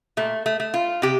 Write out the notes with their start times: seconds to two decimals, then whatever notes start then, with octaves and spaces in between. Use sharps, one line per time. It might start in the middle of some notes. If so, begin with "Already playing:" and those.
0.17 A#2 A3
0.46 A3
0.60 A3
0.74 F4
1.02 C3 G4